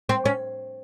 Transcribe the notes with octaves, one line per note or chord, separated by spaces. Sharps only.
C4
C#4